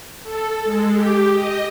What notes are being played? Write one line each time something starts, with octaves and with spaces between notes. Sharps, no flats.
A4
G#3
G4
D#5